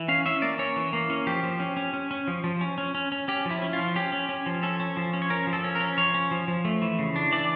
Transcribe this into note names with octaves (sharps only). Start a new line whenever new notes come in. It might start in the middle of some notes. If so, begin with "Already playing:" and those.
Already playing: E3
C#4 F5
C#4 E5
A#3 D5
C#4 C#5
E3
A#3
C#4
F3 G4
F3
C#4
C#4
C#4
C#4
F3
F3
C#4
C#4
C#4
C#4
C#4 G4
F3
E4
C#4
F4
F3
C#4 G4
C#4
C#4
F3
C#4 A4
C#4
F3
C#4
C#5
C#4 A#4
F3
A4
C#4
A#4
C#4
F3 C#5
C#4
F3
F3
A3
E3
C#3
D4
E3 D5